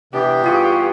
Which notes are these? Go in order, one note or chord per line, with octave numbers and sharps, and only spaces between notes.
C3 E3 B3 D4 G4
G2 F4 G#4 C#6